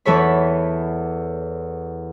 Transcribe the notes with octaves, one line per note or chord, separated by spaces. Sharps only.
E2 E3 A4 C#5 B5